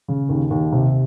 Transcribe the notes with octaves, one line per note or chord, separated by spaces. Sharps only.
C#3
D#2
D#2
C3